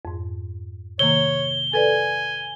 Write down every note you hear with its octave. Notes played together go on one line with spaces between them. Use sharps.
F2 G#2
C3 D#3 A#3 C#5 G7
A4 B4 D5 G#5